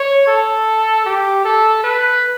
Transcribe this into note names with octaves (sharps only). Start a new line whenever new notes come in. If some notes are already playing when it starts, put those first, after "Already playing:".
Already playing: C#5
A4
G4
A4
B4